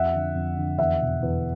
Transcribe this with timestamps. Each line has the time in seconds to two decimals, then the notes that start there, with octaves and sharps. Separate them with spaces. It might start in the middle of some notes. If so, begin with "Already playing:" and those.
Already playing: F2 E5 F#5
0.14 D3
0.35 F2
0.56 D3
0.78 E2 E5 F#5
1.01 B2
1.22 E2